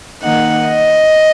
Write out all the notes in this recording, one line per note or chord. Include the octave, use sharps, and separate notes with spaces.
D#3 A#3 D#4 F#5
D#5